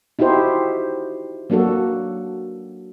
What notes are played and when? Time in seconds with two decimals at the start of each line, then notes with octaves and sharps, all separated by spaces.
0.19 D#4 E4 F#4 G4 C5
1.50 F#3 A#3 D4 F#4 A4